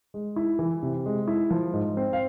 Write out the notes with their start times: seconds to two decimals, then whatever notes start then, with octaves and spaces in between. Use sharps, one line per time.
0.14 G#3
0.36 E4
0.59 E3
0.83 C3
1.06 G#3
1.28 E4
1.50 F3
1.74 G#2
1.97 C4
2.13 F5